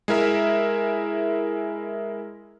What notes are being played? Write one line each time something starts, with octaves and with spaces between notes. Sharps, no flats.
G#3 E4 A#4 E5